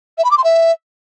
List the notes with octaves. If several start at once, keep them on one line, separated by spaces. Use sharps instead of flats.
E5
B5
D6
C6
E5